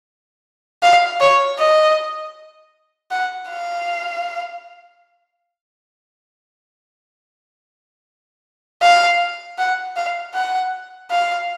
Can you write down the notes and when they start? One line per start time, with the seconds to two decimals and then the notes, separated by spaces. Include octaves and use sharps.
0.83 F5
1.21 C#5
1.59 D#5
3.11 F#5
3.49 F5
8.82 F5
9.58 F#5
9.96 F5
10.35 F#5
11.11 F5